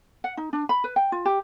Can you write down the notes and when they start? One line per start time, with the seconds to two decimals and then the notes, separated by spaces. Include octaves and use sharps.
0.24 F#5
0.37 D#4
0.53 D4
0.69 B5
0.84 B4
0.96 G5
1.12 F4
1.25 G4